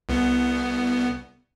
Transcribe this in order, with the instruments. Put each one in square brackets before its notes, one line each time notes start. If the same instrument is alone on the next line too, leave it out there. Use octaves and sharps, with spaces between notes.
[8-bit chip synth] C2 B3